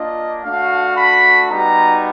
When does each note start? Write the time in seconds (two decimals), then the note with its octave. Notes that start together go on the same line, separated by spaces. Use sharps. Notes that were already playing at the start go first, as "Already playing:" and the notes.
Already playing: A#3 D4 F4 D#5
0.44 A3 D4 F#4 F5
0.97 B5
1.50 G3 B3 D#4 F#4 A#5